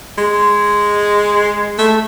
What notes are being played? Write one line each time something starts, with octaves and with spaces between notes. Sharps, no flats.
G#3
A3